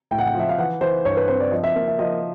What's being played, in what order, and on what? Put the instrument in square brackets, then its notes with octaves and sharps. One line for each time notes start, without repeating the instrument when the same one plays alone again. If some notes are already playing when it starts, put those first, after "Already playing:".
[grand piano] A2 [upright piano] G5
[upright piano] F#5
G5
[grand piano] F3 [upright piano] E5
[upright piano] F5
[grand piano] E3 [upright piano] F#5
[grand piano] E3 [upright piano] C5
[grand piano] G2 [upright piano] C#5
[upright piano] B4
[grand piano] C4 [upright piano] C5
[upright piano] D5
[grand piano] F3 [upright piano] D#5
[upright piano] E5
[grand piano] A#3
[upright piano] E5
[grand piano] F3 [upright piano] D#5